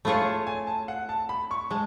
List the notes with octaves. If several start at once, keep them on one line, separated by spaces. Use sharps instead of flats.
A3 F4 G#4 C#5 B5
A5
G#5
A5
F#5
A5
B5
C#6
G#3 A5